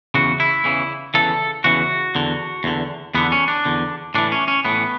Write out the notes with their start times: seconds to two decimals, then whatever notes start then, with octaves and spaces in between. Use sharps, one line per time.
0.14 E2 C#3 E3 F#4
0.40 E4
0.64 E2 C#3 E3
1.14 E2 C#3 E3 A4
1.64 E2 C#3 E3 F#4
2.15 E2 D3
2.64 E2 D3
3.15 E2 D3 B3
3.32 C#4
3.48 D4
3.65 E2 D3
4.14 A2 E3 D4
4.32 C#4
4.48 C#4
4.65 A2 E3 B3